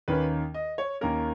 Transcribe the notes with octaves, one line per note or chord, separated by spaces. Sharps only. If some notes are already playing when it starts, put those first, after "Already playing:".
D#2 D#3 A#3 C#4 B4
D#5
C#5
D#2 D#3 A#3 C#4 A#4